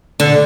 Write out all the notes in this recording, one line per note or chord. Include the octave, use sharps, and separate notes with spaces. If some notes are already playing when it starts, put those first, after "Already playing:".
D3